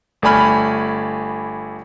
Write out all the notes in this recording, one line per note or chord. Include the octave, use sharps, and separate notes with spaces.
G1 A3 D5 G#5 B5 F6